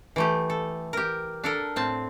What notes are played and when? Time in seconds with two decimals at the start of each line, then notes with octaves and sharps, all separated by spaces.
0.16 E3 A3 G4
0.50 A4
0.93 G4 A#4
1.44 D4 A4 A#4
1.76 A2 C4 A5